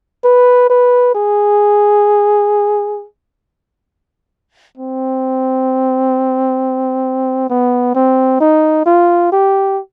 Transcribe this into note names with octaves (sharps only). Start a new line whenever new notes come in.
B4
B4
G#4
C4
B3
C4
D#4
F4
G4